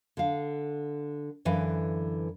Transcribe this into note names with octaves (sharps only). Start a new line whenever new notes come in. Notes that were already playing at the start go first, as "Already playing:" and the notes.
D3 F5
F#2 D3 E3 B4 F5